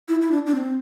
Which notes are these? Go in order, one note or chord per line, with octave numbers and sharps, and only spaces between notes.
E4
E4
D4
D4
C4